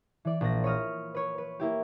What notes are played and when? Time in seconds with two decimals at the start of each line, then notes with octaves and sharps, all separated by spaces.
0.25 E3 D5
0.41 A#1 A#6
0.64 C#5 B5 D#6 F6 A#6
1.15 B4 C#5
1.38 B4
1.60 A#3 E4 G4